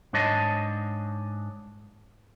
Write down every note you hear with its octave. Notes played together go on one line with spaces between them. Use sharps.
G#2 D4 C#5 D#5 A5